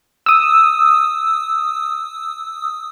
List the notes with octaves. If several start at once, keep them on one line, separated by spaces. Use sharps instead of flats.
D#6 E6